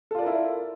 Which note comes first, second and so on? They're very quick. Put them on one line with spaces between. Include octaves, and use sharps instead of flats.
A4 F4 D5 A#4 E4